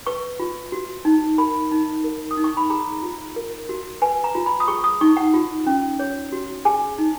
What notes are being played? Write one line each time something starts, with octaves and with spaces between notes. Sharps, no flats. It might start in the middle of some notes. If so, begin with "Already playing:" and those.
B4 C#6
F4
F#4
D#4
A#4 B5
D#4
A#4
D#6
D#4
C#6
B5
G#4 A#5
F4
A#4
F#4
B4 G#5
A#5
F4
B5
D#6
G#4 C#6
D#6
D#4 C#6
F#5
F4
C#4
C#5
F#4
G#4 G#5
D#4